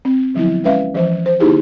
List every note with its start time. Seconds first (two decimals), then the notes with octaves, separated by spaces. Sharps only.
0.05 C4
0.34 D3 F3 F#3 B3 E4
0.64 G#3 C#4 B4 E5 F5
0.95 E3 F3 C5
1.26 C5
1.40 D3 A#3 D#4 E4 G4 G#4